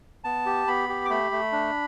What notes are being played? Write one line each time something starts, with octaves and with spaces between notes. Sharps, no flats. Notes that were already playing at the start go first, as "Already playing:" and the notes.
B3 A5
G4
B3 B5
G4
D6
A3 B5
A3
D4